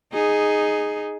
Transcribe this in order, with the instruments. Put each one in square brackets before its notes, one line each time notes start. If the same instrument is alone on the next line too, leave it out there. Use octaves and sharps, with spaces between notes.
[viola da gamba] D#4 G#4